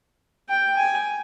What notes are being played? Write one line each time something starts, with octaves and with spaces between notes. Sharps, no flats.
G5
G#5